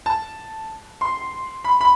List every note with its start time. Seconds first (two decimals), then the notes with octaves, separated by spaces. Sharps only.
0.06 A5
1.01 C6
1.64 B5
1.81 B5